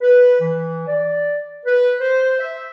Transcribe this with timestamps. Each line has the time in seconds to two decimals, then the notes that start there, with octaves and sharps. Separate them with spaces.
0.01 B4
0.40 E3
0.87 D5
1.66 B4
2.00 C5
2.40 E5